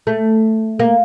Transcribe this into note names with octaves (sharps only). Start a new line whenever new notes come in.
A3
A#3